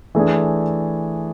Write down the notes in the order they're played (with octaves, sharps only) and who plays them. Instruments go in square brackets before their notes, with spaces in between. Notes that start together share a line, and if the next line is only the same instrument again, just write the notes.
[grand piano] E3 A3 D4 G#4